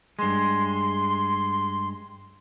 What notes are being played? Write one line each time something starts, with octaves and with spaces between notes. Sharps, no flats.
G2 G#3 C6